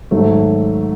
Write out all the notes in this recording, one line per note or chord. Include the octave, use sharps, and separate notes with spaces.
G#2 D#3 F#3 A3